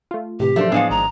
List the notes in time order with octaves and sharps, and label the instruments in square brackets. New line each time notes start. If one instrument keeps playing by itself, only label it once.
[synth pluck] A3 F4
[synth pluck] A2 C3 E3 [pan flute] G4
[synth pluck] F3 F#3 A#3 [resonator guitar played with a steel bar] A3 D4 C5
[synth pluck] A2 B3 [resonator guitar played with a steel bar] F3 G#3 D4 [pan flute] F5
[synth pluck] G#1 [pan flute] A#5